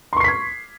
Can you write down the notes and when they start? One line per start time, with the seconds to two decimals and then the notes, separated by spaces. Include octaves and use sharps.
0.13 C6
0.17 C#6
0.20 C7
0.24 B6
0.28 G#6